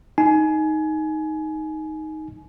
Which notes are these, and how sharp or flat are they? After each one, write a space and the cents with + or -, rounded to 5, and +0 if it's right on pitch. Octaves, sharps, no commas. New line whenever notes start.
D#4 +5 G#5 +25